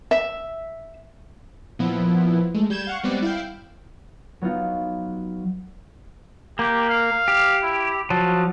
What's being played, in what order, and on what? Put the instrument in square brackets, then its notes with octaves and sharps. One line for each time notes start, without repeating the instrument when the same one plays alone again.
[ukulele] E5
[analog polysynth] A#2 F3 B3 E4
G#3 A3
G3 G6 G#6 E7
F5 F#5 C#6
G3 G#3 B3 C4 D5 F#5
E4 F5 G5
[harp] F#3 B3 D#4 F4
[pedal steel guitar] A#3 [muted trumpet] G4
[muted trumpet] F5
[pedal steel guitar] G4
[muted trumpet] E4
[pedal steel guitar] F3 F#3 [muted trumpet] A5